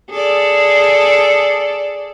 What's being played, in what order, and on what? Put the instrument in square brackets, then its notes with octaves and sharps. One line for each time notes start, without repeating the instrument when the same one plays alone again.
[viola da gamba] G#4 A4 D5